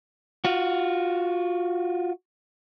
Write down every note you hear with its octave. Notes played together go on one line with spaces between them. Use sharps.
F4 F#4